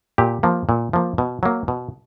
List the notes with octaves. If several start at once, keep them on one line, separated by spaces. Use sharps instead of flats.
A#2 G4
F3 A#3
A#2
F3 A#3
B2
F#3 A#3
B2